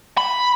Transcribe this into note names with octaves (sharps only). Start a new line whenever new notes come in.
B5